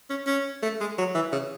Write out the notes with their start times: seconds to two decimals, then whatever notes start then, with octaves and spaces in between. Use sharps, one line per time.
0.10 C#4
0.26 C#4
0.62 A3
0.80 G#3
0.98 F#3
1.15 E3
1.32 C#3